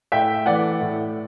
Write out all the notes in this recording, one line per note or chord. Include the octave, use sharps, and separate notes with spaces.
A2 E5 G5
E3 A3 D5 F#5
A2